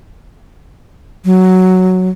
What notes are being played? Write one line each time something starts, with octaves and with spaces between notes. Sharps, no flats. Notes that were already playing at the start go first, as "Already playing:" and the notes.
F#3